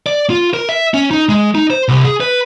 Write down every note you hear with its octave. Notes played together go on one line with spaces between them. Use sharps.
D5
F4
A#4
E5
C#4
D#4
G#3
D#4
C5
C2
G#4
B4